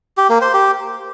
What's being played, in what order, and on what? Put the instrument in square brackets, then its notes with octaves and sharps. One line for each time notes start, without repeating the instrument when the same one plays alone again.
[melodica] G4
A#3
C5
G4